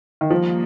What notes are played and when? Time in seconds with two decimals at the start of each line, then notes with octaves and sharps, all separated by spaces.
0.21 D#3
0.30 F3 G3 A#3 D#4